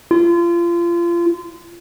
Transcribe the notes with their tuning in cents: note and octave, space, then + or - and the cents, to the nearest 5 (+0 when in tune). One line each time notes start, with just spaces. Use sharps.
F4 -30